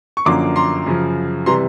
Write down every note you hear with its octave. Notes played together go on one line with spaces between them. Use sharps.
C#6
F#2 D3 F3 A#3 C6 D6
A#5 C6
F#2 C#3 F3
C3 E3 G3 A#5 C6